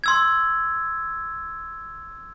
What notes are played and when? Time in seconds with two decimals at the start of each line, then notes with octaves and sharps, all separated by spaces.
0.04 C6 E6 G#6